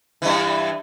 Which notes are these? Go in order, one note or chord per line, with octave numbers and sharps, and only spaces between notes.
G2 E3